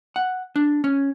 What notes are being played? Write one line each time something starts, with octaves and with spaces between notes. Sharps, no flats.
F#5
D4
C#4